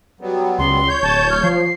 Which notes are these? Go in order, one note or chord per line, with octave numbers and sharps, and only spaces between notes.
F#3 G3 B3
C#2 C6
C#5 G6
D1 A5
F6
F3 C7